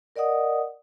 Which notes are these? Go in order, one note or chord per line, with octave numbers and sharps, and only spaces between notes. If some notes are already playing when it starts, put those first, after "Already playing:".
A#4 D5 D#5 F#5 D#6